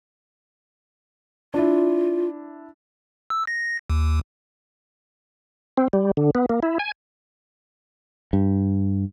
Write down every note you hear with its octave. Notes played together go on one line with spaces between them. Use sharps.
D4 E4 F4
E6
A#6
D#2
C4
G3
D3
B3
A#3
E4
G#5
G2